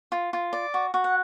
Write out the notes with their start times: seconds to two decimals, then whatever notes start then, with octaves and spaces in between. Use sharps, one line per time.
0.12 F4
0.33 F4
0.53 D5
0.74 F#4
0.94 F#4
1.04 F#5